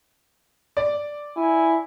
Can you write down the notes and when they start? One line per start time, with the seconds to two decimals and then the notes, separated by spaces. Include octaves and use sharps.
0.77 D5
1.36 E4 G#5